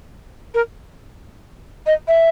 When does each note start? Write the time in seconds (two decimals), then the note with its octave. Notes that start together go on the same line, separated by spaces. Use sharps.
0.54 A#4
1.86 D#5
2.08 E5